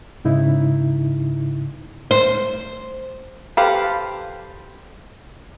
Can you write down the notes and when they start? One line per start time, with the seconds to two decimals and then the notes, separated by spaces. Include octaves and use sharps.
0.25 G#2 C#3 D#4 E4
2.11 C5
3.57 G4 A4 B4 C5 F5